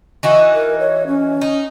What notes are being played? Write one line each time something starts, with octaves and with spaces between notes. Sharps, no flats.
E3 D#4 F#4
A#4
C#5
C#4
D#4